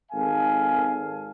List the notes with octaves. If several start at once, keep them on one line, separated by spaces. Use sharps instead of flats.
G#1 A4 F5 G#5